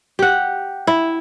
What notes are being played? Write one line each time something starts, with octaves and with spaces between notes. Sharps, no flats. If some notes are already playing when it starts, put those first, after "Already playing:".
G4 F#5
E4